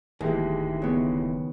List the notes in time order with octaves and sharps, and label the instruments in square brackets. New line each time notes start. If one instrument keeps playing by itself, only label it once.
[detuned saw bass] D1 [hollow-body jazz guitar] D#2 [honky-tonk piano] E3 G#3
[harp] C#3 B3